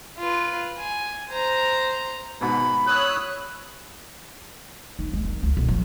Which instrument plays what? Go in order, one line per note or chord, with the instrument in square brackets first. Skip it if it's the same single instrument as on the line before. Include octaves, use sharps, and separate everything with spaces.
[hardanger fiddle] F4 B4
G#5
C5 A#5
[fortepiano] G#2 B2 [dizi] B5
[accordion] C#5 D#6 E6 [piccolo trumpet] F#6
[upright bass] D#4
G#3
D#3
D2
B1
F3